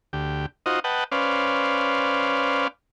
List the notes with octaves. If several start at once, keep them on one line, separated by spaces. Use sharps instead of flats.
D2 G4
D#4 F4 F#4 C5 D#5
B4 D#5 F#5 G5 A5
C#4 B4 C5 D5 F5